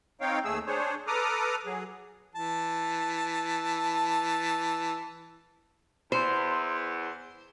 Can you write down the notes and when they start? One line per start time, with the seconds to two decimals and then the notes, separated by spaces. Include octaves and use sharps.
0.21 C4 D#4 C#5 F5 G5
0.45 D#2 A3 G#4 E6
0.67 D4 G#4 C5 C#5
1.07 A4 B4 A#5 D6 D#6 F6
1.65 F#3 G#4
2.36 E3 A5
6.12 E2 C5